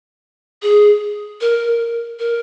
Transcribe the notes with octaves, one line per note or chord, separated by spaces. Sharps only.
G#4
A#4
A#4